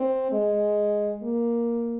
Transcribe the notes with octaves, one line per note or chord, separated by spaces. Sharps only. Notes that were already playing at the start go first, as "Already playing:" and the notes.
Already playing: C4
G#3
A#3